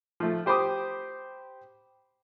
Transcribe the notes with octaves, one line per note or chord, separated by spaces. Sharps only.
F3 A3
G4 C5 B5 D6 D#6